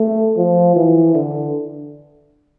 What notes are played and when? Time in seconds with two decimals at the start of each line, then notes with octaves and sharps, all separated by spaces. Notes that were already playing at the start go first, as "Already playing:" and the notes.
Already playing: A3
0.37 F3
0.76 E3
1.14 D3